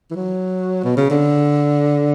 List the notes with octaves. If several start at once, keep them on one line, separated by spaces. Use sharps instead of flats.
E3
F#3
B2
C#3
D3